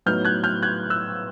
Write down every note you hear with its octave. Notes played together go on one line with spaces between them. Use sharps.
A2 F#3 B3 D#4 F6 G6
F#6 G#6
F6 G6
F#6 G#6
E6 F#6